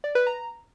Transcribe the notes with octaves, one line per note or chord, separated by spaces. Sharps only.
D5
B4
A#5